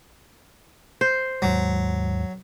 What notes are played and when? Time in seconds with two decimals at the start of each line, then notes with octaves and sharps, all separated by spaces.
1.01 C5
1.42 D#2 G#2 F#3 G#3